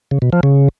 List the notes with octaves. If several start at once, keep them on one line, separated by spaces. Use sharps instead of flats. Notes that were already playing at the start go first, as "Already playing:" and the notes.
C#3
B2
F3
C#3